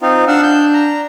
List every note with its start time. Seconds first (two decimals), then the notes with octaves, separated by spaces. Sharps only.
0.02 C4 D#4 F4
0.28 D4 F5 F#5 E6
0.43 G6
0.74 A#5